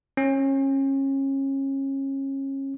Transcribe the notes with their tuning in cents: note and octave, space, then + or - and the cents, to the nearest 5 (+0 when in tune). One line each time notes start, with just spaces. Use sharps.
C#4 -30